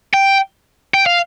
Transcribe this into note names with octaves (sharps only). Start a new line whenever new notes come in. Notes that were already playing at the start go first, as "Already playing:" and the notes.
G5
G5
F5